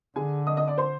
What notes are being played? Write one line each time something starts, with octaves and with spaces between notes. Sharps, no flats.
D3 G#4 G#5
D#5 D#6
D#5 D#6
D5 D6
C5 C6